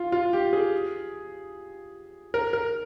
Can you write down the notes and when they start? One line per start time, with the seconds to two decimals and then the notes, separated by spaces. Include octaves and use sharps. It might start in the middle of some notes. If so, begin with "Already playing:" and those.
Already playing: F4
0.12 F4
0.33 G4
0.53 G#4
2.34 A#4
2.53 A#4